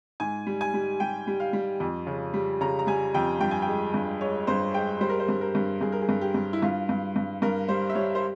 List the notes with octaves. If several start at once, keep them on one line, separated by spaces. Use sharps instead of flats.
G#2 G#5
G3
G#5
G3
G3 G5
G3
F5
G3
F2
C#3
G3
C#3 A#5
A#5
G3 G#5
F2 G5
G2 G5
G#5
G5
G#3
G2
G#3 C#5
G2 C5
G#3 G5
G3 C5
A#4
C5
G2
A#4
G2
G2 G#4
A#4
G#4
G2
G4
G2
E4
G2 F4
G2
G2
G2 A#4
G3 C5
E5
G3 C#5
C5